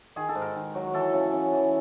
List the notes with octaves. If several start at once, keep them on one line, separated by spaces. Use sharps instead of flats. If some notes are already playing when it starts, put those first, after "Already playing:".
D#3 G#4
A4
G#2
A#4
D#3
F#3
E3 A4
C#3
C#3
E3